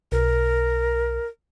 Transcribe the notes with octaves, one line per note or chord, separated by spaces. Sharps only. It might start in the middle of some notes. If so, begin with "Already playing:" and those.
B1 A#4